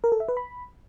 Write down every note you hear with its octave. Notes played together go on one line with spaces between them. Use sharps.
A#4
A4
E5
B4
B5